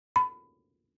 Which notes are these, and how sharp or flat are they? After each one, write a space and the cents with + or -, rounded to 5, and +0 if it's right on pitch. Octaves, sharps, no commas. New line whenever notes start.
B5 +20